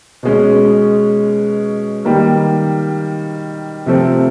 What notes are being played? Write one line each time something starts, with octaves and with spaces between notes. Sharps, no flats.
B2 G#3 C#4
D#3 G3 A#3
C3 F3 A3 C4